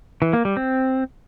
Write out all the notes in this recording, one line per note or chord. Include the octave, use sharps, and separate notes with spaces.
E3
A#3
G3
C4